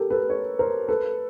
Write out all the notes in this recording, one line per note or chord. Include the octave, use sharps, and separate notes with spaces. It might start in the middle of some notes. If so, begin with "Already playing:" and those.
Already playing: G4 A4 A#4
A4 B4
B4 C#5
A#4 C5
A4 B4